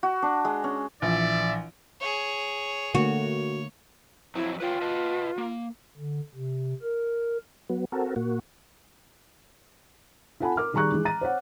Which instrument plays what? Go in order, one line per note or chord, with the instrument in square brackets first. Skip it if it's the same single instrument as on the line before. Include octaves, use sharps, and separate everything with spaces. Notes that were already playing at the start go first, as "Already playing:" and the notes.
[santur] F#4
D4
G#3
C#4
[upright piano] A#1 [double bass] E3 [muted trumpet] D5 [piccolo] E5
[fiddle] G#4 C#5
[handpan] D3 A3 A#3 [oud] F#4 [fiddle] C#5
[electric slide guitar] F2 F#3 C4 [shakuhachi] E4
[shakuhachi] F4 [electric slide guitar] B4 C#5 G5
[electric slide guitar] B4 D#5 A5
A#3
[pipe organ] D3
C3
A#4
[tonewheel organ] F#3 B3
C4 F#4 A4 A#4
A#2 A#3 F#4
[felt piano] F4 A4 F#5 G#5 A5 B5
A#4 D6 F6
D#3 G3 G#4 A#5 C#6 F#6
E3 G#3
A#5 A6 D#7
C5 C#5 F#5